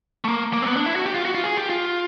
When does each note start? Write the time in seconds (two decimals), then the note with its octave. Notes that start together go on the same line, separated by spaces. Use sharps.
0.24 A3
0.28 A#3
0.53 A#3
0.62 C4
0.67 B3
0.76 D4
0.86 E4
0.96 F#4
1.06 G4
1.14 F4
1.25 F#4
1.35 F4
1.44 G#4
1.57 G4
1.70 F4